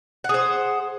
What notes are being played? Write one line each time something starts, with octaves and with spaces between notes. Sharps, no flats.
G#4 C5 F#5